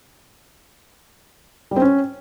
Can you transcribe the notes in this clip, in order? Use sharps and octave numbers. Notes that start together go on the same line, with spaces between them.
G3
C4
C#4